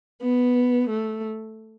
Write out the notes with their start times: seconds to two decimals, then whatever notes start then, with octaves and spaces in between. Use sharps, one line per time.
0.21 B3
0.89 A3